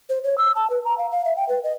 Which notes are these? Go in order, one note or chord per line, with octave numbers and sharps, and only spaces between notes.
C5
C#5
E6
A5
B4
A#5
F5
F5
E5
G5
B4
D#5